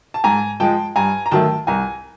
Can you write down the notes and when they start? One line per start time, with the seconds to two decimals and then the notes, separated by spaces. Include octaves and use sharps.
0.14 A5
0.24 G#2 G#5 A#5
0.60 F3 G#3 G5 A5
0.96 G2 G#5 A#5
1.26 A#5
1.31 D#3 F#3 A3 G5 A5
1.67 C2 G#5 A#5